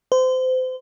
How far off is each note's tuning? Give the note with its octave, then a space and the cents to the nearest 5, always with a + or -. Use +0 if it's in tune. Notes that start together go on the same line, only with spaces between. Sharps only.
C5 -30